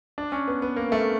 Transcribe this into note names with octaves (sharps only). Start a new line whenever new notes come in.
D4
C#4
B3
B3
A#3
A3